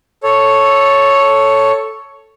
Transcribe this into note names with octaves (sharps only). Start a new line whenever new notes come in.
A4 C#5